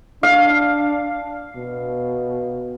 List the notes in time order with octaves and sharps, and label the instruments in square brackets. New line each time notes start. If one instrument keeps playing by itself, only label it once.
[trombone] D4 [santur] F5
[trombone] B2